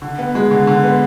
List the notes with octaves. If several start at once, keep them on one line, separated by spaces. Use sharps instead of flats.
D3
B3
G#3
D3
D3
B3